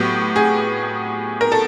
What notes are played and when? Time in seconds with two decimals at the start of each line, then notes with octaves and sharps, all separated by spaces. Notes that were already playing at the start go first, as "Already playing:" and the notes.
Already playing: A2 F#3 B3 G4
0.36 G#4
1.41 A#4
1.52 A4